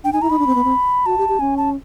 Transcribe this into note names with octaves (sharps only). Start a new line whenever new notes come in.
D4 G5
D#4 G#5
E4 A#5
D#4 B5
D4
C4
B3
C4
F#4 A5
G4
G4
C#4 G#5
A5